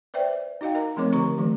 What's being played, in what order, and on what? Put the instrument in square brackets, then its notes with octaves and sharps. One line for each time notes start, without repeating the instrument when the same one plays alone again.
[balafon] B4 C5 D5 E5 G5
D#4 F#4 D#5 F5 G5
A#4 D#5 A#5
F3 A3 C4 A#4 C#5 D6
D3 G4 A#5 C#6
E3 F#3 A3